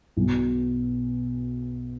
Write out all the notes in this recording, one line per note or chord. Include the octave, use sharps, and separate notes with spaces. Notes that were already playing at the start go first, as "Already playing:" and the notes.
B1 B2 F#3